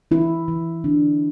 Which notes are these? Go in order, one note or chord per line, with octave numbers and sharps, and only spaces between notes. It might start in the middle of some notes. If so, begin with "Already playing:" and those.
E3 E4
E3
D3 D4